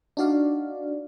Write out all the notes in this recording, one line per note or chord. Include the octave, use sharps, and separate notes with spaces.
D4 D#4 F#4 D5 F5